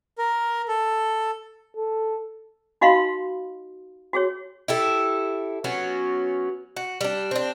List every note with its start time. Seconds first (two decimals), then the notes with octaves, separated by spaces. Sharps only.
0.18 A#4
0.68 A4
1.76 A4
2.81 D#4 F#4 D#5 F5 B5 C6
4.13 F#4 G#4 C#5
4.68 E4 G4 A4
5.64 F#3 B3 C#4 F#4
6.76 F#4
7.01 G3 D4
7.31 C4 D4